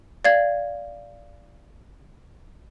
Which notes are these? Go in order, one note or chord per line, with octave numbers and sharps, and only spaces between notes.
D5 F5 G#6